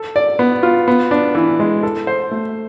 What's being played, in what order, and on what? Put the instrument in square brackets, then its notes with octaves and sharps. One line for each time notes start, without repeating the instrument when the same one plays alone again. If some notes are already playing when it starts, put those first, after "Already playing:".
Already playing: [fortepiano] A4
D5
B3
F4
B3
D4
E3
G#3
A4
C5
A3